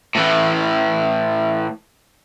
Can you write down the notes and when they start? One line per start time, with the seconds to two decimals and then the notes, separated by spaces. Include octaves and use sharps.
0.15 A2 E3